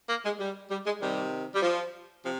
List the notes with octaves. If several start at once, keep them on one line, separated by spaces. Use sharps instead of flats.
A#3
G#3
G3
G3
G#3
C3 D#3 G3
G3
F3
C3 F3